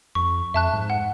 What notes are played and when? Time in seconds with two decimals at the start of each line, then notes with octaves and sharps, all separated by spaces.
0.15 F2 C#6
0.54 F2 E5 A5 F#6
0.74 G#2
0.90 F#5